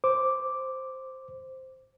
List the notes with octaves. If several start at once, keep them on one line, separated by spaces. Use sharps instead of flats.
C5 D6